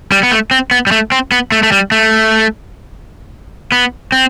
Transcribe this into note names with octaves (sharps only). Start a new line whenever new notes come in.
G3
B3
A3
C4
B3
G3
A3
C4
B3
A3
A3
G3
A3
B3
C4